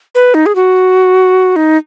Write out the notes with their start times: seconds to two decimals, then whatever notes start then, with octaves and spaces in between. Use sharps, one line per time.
0.15 B4
0.34 D#4
0.46 G#4
0.56 F#4
1.56 D#4